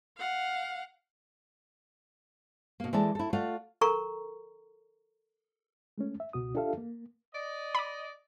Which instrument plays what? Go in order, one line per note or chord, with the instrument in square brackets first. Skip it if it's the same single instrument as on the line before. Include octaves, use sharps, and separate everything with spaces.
[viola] F5 F#5
[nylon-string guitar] B2 A#3
E3 G#3 A4 D5 A5
E4 A4
A3 F4 D5 F5 F#5
[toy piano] A4 A#4 A#5 C#6
[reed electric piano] G#3 A3 C#4
E5
C#2 B2 F#4 D#6
D4 F4 G4 A4 E5 F5
A#3
[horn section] D5 D#5
[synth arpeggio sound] B5 D6